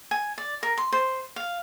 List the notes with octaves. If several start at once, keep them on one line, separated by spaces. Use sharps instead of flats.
G#5
D5
A#4
C6
C5
F5